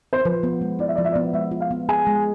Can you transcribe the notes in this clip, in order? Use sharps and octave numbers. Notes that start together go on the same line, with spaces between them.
C5
F3 B4
B3
G#3
E4 D5
E5
F3 D5
E5
D5
B3
G#3 E5
F4
F5
B3
G#4 G#5
G#3